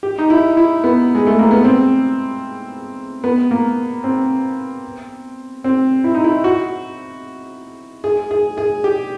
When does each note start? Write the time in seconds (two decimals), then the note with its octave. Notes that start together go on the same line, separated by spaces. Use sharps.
0.03 G4
0.18 D#4
0.30 E4
0.57 E4
0.84 B3
1.15 G#3
1.27 A3
1.39 A#3
1.51 B3
1.64 C4
3.24 B3
3.51 A#3
4.04 C4
5.64 C4
6.04 E4
6.14 D#4
6.24 E4
6.44 F#4
8.04 G#4
8.31 G#4
8.58 G#4
8.84 G4